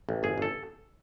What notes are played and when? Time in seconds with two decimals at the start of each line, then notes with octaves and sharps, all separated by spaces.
0.09 A1
0.23 G1 G#4
0.38 G1 A4